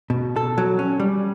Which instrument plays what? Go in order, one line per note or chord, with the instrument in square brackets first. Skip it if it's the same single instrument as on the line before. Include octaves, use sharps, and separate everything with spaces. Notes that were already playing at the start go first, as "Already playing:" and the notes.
[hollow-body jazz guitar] B2
A4
F#3
C#4
G3